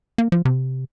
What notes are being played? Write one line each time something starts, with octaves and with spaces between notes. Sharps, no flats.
A#3
F3
C3